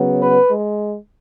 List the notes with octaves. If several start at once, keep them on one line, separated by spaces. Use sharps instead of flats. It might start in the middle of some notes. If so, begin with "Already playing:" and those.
Already playing: C#3 F#3 B3
B4
G#3